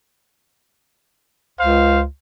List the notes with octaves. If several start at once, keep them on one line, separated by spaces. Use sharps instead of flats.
C#2 C5 F5